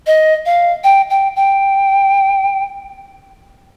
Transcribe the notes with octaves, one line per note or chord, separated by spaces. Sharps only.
D#5
F5
G5
G5
G5